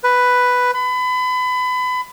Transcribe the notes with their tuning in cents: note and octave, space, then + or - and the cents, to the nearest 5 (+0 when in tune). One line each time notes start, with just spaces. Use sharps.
B4 +5
B5 +30